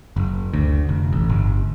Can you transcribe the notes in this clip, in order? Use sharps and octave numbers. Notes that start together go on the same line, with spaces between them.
F#1
D2
F1
A1
G1